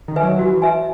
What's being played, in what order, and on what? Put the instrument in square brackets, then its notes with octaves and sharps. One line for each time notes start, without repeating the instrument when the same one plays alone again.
[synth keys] D#3
[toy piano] B4 E5 G#5
[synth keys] F#3
[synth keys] E3 [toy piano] F#4
[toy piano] B4 E5 G#5